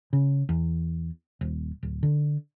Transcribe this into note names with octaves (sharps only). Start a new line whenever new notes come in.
C#3
E2
D#1
D1
D3